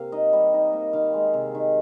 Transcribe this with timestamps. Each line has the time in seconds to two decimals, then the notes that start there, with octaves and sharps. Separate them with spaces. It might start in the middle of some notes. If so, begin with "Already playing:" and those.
Already playing: C3 A#3 F5
0.12 D#4 D#5
0.33 G3
0.54 D#4
0.73 A#3
0.93 D#3 F5
1.14 G#3
1.34 C3
1.55 D#3